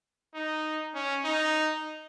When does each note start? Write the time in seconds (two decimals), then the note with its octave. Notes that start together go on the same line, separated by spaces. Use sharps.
0.34 D#4
0.95 C#4
1.24 D#4